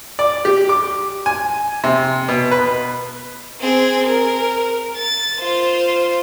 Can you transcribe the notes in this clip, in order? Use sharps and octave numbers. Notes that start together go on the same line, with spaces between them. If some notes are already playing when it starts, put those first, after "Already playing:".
D5
G4
D6
G#5
C3
B2
B4
C4 G#4
A#4
A6
F4 C5